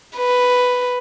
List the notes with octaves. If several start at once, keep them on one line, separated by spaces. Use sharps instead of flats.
B4